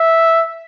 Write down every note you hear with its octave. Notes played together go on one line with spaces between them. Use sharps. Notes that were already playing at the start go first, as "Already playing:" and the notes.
Already playing: E5